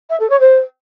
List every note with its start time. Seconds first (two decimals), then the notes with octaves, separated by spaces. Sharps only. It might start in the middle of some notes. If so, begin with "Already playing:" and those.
0.10 E5
0.20 A4
0.30 C#5
0.40 C5